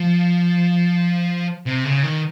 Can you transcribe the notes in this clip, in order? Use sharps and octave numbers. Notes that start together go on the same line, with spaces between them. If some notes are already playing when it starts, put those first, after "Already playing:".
Already playing: F3
C3
C#3
D#3